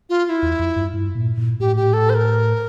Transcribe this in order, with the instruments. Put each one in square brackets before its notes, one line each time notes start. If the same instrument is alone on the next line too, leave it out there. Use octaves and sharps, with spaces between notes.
[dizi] F4
F4
E4
[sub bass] E2
F2
G2
G2
A#2
A#2
[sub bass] A2 [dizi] G4
[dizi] G4
A4
C5
A#4